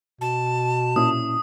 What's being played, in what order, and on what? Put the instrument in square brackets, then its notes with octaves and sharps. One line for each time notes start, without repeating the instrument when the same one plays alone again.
[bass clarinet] B2 [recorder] A5
[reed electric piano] A#2 C#4 E4 [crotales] D#6